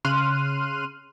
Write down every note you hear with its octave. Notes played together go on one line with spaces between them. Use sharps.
C#3 C6 F6 F#6 D#7